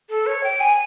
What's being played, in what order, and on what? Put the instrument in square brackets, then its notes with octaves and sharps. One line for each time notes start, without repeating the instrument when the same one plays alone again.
[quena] A4
C#5
G5
G#5